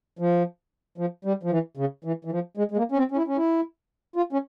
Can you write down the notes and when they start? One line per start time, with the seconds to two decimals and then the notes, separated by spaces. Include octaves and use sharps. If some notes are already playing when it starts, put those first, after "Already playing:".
0.19 F3
0.98 F3
1.25 G3
1.43 F3
1.51 E3
1.77 C#3
2.04 E3
2.25 E3
2.31 F3
2.57 G#3
2.71 G#3
2.77 A#3
2.92 C#4
2.97 C4
3.11 C#4
3.17 E4
3.27 C#4
3.37 E4
4.16 F4
4.33 C#4